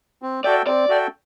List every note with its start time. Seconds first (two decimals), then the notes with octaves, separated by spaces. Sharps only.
0.22 C4
0.44 F#4 A4 D5 E5 G5
0.67 C4 D5
0.89 F#4 A4 E5 G5